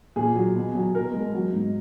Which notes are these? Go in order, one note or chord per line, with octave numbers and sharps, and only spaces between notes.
A#2 G#4
F#3
B2
F#3
B2 A#4
G#3
F#3
G#2